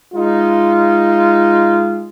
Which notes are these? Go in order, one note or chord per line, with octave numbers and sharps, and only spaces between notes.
G#3 D#4 F4